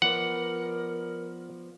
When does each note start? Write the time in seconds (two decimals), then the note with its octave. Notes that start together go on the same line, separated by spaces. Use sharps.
0.02 F3 B3 A#4 D5 F#5